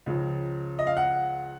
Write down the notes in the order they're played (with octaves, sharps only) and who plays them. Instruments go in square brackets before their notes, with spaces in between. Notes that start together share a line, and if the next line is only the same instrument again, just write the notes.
[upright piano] C#2 C#3 F3
D#5
F5
F#5